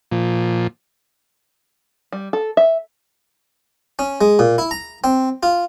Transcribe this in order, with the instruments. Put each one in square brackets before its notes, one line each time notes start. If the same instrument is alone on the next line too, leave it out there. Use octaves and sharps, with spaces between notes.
[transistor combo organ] A#2 F3
[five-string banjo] G3
A4
E5
[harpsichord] C#4
G#3
A#2
E4
A#5
C4
F4